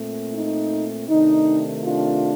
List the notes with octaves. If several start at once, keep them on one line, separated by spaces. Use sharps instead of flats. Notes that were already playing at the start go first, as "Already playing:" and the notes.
Already playing: A#2 A3 C4
D#4
C3 D#3 A3 D4 D#4
D4 F4